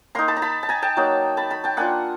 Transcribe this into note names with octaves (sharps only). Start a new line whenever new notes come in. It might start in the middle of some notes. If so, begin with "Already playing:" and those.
A#3 D#4 A#5 C6
A5 B5
A#5
A5 B5
A5
G#5 A#5
G5 A5
F#3 A#3 D#4
A5 B5
A5 B5
G5 A5
A#3 D4 F4 F#5 G#5